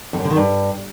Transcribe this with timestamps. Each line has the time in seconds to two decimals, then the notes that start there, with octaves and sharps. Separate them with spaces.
0.13 F2
0.19 F#2
0.25 D3
0.30 D#3
0.36 G2